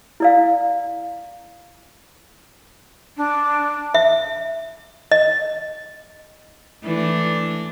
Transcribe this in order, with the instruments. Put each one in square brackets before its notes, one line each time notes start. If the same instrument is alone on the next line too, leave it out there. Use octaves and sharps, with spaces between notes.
[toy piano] E4 D5 F5
[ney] D4
[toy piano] E5
D#5
[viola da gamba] E3 A3 D4